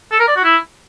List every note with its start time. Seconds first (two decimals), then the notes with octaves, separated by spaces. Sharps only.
0.12 A4
0.20 A#4
0.28 D5
0.36 F#4
0.44 E4